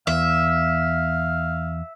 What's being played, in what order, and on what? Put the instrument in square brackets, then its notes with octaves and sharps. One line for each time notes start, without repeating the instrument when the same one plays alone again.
[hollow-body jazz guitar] E2 [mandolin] E5 [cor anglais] F5